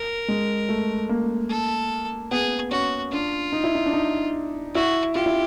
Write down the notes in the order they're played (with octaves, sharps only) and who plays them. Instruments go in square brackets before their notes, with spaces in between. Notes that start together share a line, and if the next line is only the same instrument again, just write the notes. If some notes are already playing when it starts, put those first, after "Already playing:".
Already playing: [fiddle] A#4
[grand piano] G#3
A3
A#3
[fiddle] A4
[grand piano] B3 [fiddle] G#4
[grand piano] C#4 [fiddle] F#4
[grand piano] D4 [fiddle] F4
[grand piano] D#4
E4
D#4
D4
D#4
[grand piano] E4 [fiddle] F#4
[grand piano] F4 [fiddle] G4
[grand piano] E4